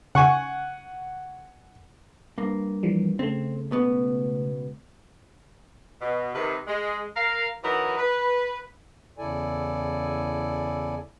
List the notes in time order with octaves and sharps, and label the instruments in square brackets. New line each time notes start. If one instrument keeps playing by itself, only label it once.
[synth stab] C#3 C#6 [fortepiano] F#5 G#5
[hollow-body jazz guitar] G2 A#3
[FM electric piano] E3 F3 G3
[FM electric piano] C#3 A3 [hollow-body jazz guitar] C4
[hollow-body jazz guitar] C#2 B2 B3
[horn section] B2
C3 D#3 B4
G#3
A#4 F5
E3 F#3 D#4 E4 A#4 B4
B4
[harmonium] E2 C#3 E4 A4 D5 G#5